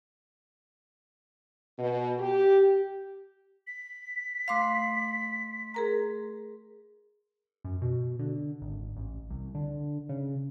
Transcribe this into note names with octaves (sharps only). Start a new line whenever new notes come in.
B2
G4
B6
A3 F5 C6 D6 C7
G#4 A#4 A#5
F#2
B2
D3
G#1
A1
C2
D3
C#3